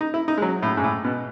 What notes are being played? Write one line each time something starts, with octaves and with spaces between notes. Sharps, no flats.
D#4
E4
D#4
G#3
F#3
A2
G#2
A2
B2